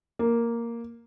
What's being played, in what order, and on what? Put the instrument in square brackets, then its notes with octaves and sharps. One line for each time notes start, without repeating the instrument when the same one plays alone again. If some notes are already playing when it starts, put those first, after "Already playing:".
[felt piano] A#3